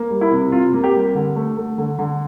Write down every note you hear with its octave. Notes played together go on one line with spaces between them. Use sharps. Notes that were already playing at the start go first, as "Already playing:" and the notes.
Already playing: A#3
G3
E4
C3
C3 F4
A#3
G4
G3
D3
A3
A3
D3
D3